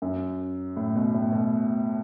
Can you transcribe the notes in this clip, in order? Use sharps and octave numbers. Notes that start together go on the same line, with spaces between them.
F#2
A2
B2
A2
B2